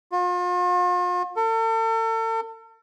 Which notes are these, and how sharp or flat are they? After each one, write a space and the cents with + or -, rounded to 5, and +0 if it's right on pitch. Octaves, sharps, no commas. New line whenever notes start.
F4 +40
A4 +40